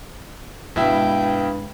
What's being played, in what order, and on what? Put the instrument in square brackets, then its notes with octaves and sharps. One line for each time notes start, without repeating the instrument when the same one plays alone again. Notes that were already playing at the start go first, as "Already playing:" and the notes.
[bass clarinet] G2 [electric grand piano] B2 E4 E5 [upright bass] G#3 [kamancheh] G5